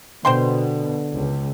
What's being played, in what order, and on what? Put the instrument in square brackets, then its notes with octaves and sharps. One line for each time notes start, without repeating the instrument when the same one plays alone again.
[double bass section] B2 [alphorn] D3 [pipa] C5 G5 C6
[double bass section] C#2